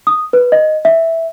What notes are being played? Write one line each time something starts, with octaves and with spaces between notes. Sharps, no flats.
D#6
B4
D#5
E5